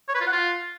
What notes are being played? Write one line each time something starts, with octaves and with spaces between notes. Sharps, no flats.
C#5
B4
F4
F#5
F4